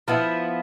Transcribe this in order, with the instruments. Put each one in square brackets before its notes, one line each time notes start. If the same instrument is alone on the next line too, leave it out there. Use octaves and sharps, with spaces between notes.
[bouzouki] F3 B3 E4